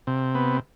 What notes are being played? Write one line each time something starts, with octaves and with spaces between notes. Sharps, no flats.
C3
B3